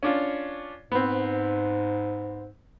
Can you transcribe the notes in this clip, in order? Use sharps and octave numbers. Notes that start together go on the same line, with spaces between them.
C#4 D4 F4
G#2 B3 C4